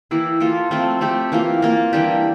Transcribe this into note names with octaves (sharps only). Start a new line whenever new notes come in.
E3 A#3 E4 G4
A#3 F4 A4
F3 A3 C4 F4
A3 C4 G4
E3 A#3 F4
A#3 F4 A#4
E3 G3 D4 G4